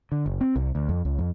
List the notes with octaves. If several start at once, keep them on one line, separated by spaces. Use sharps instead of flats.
D3
F#1
C4
C2
D2
F2
C#2
F2